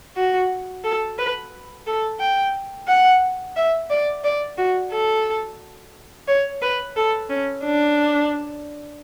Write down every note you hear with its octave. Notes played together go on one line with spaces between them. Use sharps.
F#4
A4
B4
A4
G5
F#5
E5
D5
D5
F#4
A4
C#5
B4
A4
C#4
D4